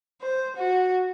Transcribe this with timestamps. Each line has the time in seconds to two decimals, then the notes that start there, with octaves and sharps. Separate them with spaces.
0.21 C5
0.56 F#4